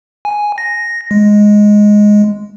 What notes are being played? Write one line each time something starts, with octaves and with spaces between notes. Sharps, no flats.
G#5
A#6
G#3